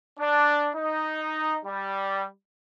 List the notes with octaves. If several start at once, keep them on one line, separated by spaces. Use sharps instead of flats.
D4
D#4
G3